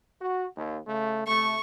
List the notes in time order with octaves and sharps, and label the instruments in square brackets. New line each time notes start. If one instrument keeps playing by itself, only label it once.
[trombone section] F#4
D#2
C#3 A3
[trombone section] C3 A3 [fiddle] C#6